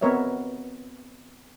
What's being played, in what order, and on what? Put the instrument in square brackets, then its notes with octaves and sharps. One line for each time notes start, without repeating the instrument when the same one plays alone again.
[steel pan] B3 C4 A#4 C#5 D#5 E5